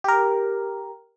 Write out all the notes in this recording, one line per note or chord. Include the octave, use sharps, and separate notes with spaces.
G4 A#4